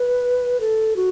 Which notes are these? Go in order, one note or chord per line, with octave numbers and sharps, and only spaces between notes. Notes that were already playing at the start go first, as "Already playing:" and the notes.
Already playing: B4
A4
F#4